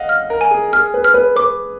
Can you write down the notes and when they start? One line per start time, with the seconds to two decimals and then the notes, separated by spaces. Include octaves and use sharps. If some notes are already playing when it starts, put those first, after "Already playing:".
Already playing: D#5 F5 F#5
0.09 F6
0.30 A#4
0.41 G#5
0.51 G#4
0.73 G#4 F6
0.94 B4
1.04 F6
1.14 B4
1.36 B4 D6